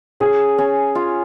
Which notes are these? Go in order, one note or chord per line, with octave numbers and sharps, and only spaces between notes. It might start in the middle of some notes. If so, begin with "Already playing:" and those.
C#4 G#4
C#4
F4